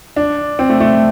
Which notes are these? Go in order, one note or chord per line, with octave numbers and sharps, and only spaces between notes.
D4
C4
A3
A3